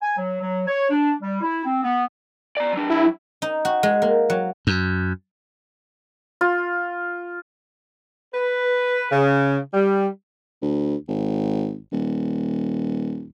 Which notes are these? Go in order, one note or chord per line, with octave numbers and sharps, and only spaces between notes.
G#5
F#3
F#3
C#5
D4
G3
E4
C4
B3
D5 A#5
F#3 D4
E4
D#4
F#4
G#3
A#3
F#3
F#2
F4
B4
C#3
G3
D2
G#1
D#1